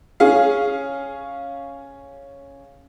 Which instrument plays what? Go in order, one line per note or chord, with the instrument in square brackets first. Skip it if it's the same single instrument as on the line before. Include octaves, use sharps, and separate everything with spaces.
[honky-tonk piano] C#4 G#4 F5